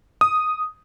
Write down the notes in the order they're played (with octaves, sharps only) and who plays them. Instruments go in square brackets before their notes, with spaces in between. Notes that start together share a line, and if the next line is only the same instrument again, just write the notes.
[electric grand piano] D#6